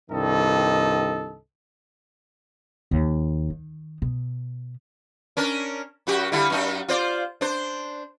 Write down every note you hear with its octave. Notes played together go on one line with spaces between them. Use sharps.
C2 G2 D#3 A4 D#5
D#2
D#3
B2
C#4 D4 A#4
F#2 F#4 G4
D3 G3 E4
F#2 D#4
F4 C5 D5
D4 C5